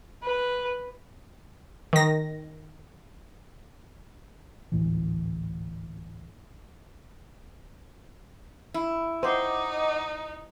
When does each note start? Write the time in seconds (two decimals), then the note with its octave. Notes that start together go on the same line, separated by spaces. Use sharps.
0.24 B4
1.93 D#3 A#6
4.72 G#1 D2 A2 E3
8.74 E4
9.23 D#4 C5 D#5 F#5 D6